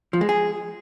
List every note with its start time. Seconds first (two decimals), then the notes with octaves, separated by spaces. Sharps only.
0.13 F3
0.21 G#3
0.29 G#4